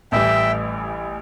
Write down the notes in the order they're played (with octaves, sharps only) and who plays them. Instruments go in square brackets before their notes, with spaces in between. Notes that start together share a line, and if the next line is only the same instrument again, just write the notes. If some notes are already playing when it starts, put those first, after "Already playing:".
[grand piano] A1 A2 E3 G3 [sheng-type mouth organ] E5 G5